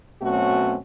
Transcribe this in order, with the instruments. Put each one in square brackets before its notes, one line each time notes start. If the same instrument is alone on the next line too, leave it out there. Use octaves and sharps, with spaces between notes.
[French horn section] B2 F#3 A3 C4 C#4 F#4